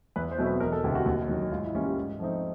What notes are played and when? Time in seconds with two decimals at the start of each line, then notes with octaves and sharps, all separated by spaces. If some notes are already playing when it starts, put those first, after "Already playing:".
0.16 E2 B4
0.31 C5
0.38 B2 F#3 A3 C4
0.46 B4
0.60 E1 A#4
0.72 A4
0.84 D2 C3 G4
0.95 F#4
1.06 D#2
1.29 D#3 F#3
1.52 G#2 F4
1.63 E4
1.74 E3 G3 A#3 C#4 F4
1.85 G4
1.97 G#2
2.19 F3 A3 C4 D#4